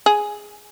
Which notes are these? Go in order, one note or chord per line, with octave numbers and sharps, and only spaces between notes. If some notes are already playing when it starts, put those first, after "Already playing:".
G#4